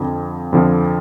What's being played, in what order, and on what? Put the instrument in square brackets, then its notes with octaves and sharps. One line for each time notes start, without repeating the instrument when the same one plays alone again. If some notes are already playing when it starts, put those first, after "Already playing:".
Already playing: [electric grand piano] F2 D3 F3
F2 D3 F3